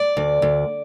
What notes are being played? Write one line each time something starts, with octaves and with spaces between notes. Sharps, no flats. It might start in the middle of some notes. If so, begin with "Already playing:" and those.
Already playing: D5
D2
D2